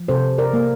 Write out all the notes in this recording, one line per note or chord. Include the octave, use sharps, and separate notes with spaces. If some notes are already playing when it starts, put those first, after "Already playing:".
Already playing: F3
C3 A4 C5
A#4 D5
A#3